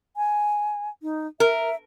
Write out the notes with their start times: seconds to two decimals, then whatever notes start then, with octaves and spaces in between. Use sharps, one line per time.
0.17 G#5
1.03 D#4
1.40 A#4 E5